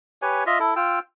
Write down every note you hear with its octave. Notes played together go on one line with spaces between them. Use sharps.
G4 B4 C#5 G#5
F4 D#5 E5
E4 A4
F4 G5 E6